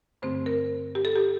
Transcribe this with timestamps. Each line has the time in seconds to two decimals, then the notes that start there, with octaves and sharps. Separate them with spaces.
0.22 G2 D3 A3 C4 C5
0.46 A#4
0.95 G4
1.05 A4
1.16 G4